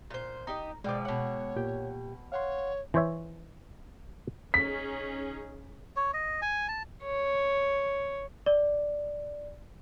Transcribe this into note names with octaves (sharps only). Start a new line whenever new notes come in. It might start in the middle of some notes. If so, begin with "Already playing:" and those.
A#2 C5
D#4 G4 D#5 A#5
B2 F3 G#3 D5 G5 D6
B2 C#5 F#5
A#2 G4 G5
C#5 F5 F#5 C6
E3 C5 C#5 E5
C#4 D#4 G#4 B6
C#5
D#5
G#5
A5
C#5
D5